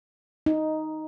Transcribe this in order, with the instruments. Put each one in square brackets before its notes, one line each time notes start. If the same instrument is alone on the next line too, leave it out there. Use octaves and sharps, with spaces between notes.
[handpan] D#4